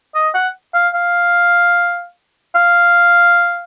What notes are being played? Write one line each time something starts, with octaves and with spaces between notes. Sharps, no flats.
D#5
F#5
F5
F5
F5